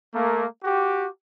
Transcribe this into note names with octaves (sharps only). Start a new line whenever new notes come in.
A3 A#3
F#4 G4